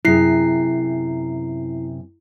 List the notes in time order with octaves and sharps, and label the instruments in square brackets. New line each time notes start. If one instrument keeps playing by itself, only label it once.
[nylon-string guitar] F#2 C3 G#4 [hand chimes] E4 C7